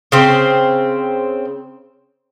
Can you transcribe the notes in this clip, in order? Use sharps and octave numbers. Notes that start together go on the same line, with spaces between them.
C#3 C4